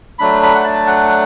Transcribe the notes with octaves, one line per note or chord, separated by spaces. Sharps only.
F#3 A3 D4 B5
B5
F#5
A5
F#5